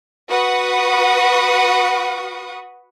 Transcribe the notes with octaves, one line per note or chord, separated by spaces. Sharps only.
F#4 B4 F#5 B5 C#6 D#6